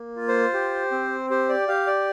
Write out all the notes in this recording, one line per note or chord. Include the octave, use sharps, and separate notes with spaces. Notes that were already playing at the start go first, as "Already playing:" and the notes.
Already playing: A#3
F4
C5
G4
C4
G4 C5
D5
G4 F5
D5